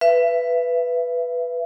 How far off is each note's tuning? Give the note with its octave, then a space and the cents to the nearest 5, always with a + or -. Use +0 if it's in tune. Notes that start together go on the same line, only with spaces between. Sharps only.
B4 +0 E5 +30